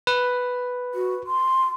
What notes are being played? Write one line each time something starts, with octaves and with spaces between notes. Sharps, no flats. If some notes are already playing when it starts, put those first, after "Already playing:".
B4
F#4
C6